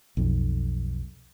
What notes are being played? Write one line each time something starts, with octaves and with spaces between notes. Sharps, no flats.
B1 F2